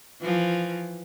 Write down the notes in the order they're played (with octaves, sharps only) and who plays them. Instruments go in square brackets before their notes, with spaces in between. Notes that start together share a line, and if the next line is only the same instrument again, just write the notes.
[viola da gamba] E3 F3